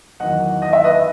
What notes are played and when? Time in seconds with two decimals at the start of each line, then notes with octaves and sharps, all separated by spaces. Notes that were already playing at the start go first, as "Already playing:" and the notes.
0.20 E2 D#3 F#3 D#5 F#5
0.62 D#5
0.73 E5
0.84 B4 D#5